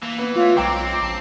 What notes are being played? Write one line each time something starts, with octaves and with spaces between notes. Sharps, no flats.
E3 A#3
B3
A3 F4 C#5
B1 F#3 G#3 C4 C#5 G5 A#5 D6
A#1 A5